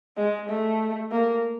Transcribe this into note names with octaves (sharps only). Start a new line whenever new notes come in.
G#3
A3
A#3